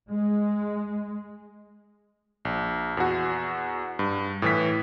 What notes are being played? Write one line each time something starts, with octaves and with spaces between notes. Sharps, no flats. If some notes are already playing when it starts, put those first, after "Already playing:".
G#3
A#1
E2 F#4
G2
A2 E3 B6